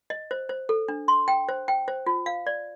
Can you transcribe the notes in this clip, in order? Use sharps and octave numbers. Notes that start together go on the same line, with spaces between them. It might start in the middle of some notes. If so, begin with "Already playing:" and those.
D#5
C5
C5
A4
D4
C6
G5
C5
G5
C5
F4
F5
D5